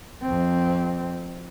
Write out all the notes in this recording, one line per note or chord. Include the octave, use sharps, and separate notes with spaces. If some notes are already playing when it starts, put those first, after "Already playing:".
F2 C4